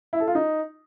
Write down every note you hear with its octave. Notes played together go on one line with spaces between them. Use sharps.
E4
A4
F4
D#4